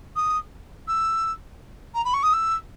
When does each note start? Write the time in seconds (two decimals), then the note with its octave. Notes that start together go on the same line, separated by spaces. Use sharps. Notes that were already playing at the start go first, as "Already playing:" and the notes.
0.16 D#6
0.88 E6
1.94 A#5
2.04 B5
2.13 C#6
2.23 D#6
2.33 E6